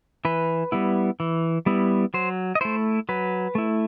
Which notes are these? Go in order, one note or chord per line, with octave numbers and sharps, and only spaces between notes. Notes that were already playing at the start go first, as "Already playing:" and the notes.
E3 B4
G3 B3 E4
E3
G3 B3 E4
F#3 C5
D#5
A3 E4 C5
F#3 B4
A3 E4